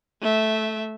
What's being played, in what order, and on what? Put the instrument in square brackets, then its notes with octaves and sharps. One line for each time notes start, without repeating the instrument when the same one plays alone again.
[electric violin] A3 E5